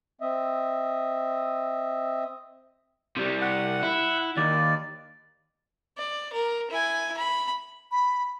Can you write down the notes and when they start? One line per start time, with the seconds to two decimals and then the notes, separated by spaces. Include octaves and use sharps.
0.21 C4 D#5 E5
3.17 C3 G3
3.42 F#5
3.83 E4
4.37 D#2 D5
5.98 D5
6.33 A#4
6.70 E4 G#5
7.17 B5
7.92 B5